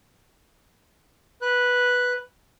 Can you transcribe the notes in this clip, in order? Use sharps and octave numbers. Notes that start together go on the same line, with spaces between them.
B4 F#6